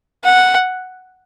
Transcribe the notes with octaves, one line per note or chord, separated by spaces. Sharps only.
F#5